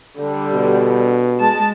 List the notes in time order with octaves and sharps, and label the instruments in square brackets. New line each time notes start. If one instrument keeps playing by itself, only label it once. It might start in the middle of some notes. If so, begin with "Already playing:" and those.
[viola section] D3 G3
[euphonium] B2
[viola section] G#3 A5